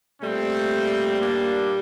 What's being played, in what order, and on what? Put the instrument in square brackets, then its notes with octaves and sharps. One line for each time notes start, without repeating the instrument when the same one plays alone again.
[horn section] A#2 G3 A3 C4
A#3 D4